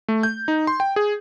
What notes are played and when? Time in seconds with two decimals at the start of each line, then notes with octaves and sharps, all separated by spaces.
0.08 A3
0.23 G6
0.48 D#4
0.67 C6
0.80 G5
0.96 G#4